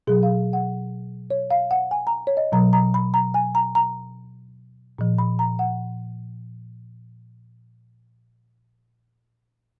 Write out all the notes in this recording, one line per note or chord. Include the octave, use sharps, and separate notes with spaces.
B2 F#3 G#4
F5
F#5
C#5
F5
F#5
G#5
A#5
C#5
D#5
B2 F#3 A#5
A#5
B5
A#5
G#5
A#5
A#5
A#2 F3
B5
A#5
F#5